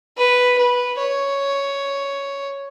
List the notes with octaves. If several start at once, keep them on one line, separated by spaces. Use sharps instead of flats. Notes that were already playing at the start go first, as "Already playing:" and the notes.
B4
B4
C#5